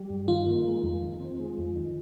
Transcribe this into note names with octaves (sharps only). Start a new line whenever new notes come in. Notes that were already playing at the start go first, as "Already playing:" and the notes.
Already playing: G3
G2
D#3 F4
A#3
G#3
F2
D#3
C4
G#3
F2
D#3